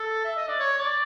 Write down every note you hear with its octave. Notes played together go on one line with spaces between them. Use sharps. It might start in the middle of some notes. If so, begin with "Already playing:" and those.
Already playing: A4
E5
D#5
D5
C#5
D5